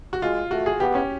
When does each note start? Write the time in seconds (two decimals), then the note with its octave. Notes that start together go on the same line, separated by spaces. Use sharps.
0.13 F#4
0.22 G#3 F4
0.51 A3 F#4
0.66 G#4
0.80 B3 G4
0.95 C#4